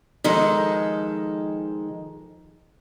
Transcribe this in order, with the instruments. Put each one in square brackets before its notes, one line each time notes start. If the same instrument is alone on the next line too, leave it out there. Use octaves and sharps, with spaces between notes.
[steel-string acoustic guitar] D#3 F3 G#3 A4